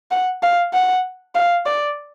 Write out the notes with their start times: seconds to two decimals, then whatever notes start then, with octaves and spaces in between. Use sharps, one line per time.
0.11 F#5
0.42 F5
0.73 F#5
1.35 F5
1.66 D5